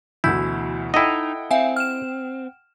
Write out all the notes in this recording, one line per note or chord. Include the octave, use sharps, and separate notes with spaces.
D2 B2 E3 E4 G6
D#4 E4 A4 D#5 F#5 G5
C4 E5 F5 G#5
F6 E7